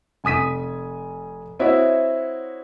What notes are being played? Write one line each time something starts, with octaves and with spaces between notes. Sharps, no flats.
F1 G#5 D#6 B6 D#7
C4 E4 F#4 C#5 D#5 E5